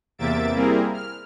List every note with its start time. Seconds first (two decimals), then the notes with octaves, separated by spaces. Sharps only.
0.18 E2 C3 A#3 E5 A6 D7
0.55 G3 A#3 C4 E4 G#4 A#4
0.93 F6